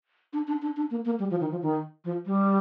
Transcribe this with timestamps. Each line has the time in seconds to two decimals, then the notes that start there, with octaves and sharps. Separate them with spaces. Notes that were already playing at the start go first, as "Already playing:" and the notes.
0.33 D4
0.47 D4
0.62 D4
0.77 D4
0.91 A#3
1.05 A#3
1.19 G3
1.31 F3
1.41 D#3
1.51 F3
1.62 D#3
2.05 F3
2.26 G3